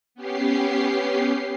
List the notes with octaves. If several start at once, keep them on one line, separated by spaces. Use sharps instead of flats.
B3 C#4 G4 C7